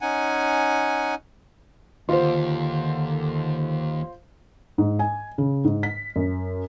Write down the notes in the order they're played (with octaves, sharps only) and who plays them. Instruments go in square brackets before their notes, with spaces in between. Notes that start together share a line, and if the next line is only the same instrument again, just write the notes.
[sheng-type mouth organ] C#4 D#4 F#5 G#5
[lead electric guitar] D#2 [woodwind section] D3 [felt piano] F4 C5
[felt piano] G#2
G#5
C#3
G#2
B6
F#2